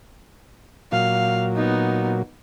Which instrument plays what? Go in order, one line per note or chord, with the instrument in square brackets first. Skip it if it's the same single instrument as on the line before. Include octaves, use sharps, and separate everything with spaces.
[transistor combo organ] A#2 F#3 [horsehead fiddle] F5
[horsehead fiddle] B3 D#4